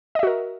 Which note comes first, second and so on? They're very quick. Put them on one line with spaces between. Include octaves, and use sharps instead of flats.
D#5 E5 F#4 A#4